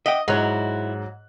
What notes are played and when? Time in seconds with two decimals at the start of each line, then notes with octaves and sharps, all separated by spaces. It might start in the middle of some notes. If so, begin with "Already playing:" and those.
0.06 D#5 E5 F#5 G5
0.28 G#2 F#3 E4 C#5 D#5 F#6